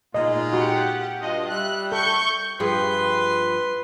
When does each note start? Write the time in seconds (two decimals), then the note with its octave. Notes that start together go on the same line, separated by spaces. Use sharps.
0.14 A#2 G#3 D#4 F4 D#5
0.53 F#4 G4 F#5
1.20 G2 F4 D#5
1.49 G3 E5 F#6
1.92 A4 C#6 G6
2.60 G2 F3 G#4 B4 C6